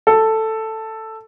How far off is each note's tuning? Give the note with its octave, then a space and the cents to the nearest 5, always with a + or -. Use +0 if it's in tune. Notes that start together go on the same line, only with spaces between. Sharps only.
A4 +5